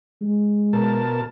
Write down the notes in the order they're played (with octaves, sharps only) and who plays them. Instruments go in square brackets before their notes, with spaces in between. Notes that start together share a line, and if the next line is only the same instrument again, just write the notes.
[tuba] G#3
[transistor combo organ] B2 A#4 A5